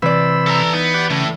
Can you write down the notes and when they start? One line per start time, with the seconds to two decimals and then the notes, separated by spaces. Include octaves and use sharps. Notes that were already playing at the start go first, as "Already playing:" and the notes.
0.02 C3 E3 D5 B5 E6
0.46 A4 A#5
0.73 B3 D#4
0.94 G4 D5 F#5
1.10 A2 C#3